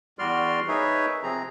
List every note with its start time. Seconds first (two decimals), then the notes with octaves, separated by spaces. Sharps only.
0.19 E2 G3 F#4 D5 C6 F6
0.68 D#4 G#4 A#4 B4 C#5 E5
1.23 C3 F3 C4 G#4 A#5